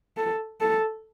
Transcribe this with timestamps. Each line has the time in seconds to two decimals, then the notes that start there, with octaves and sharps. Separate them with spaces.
0.17 A4
0.61 A4